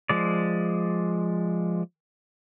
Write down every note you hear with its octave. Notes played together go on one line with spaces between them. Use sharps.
F3 G#3 D5